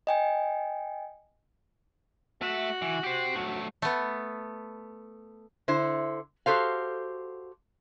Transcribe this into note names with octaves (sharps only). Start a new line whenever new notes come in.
D#5 G5 G#5
A3 F#4 E5
E3
G4 C5
F#3 A3
A3 B3
D3 E4 C5
F#4 G4 A4 C5 F5